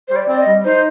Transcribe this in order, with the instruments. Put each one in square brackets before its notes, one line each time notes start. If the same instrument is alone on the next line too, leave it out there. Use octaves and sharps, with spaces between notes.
[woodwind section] G3 [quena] C5
[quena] D5
[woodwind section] C4 [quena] D5
[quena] D#5
[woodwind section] G3
[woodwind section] D#4 [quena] C5